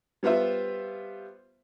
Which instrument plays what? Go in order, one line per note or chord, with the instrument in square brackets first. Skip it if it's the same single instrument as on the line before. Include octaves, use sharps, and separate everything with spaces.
[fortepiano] G3 B3 F4 C5 E5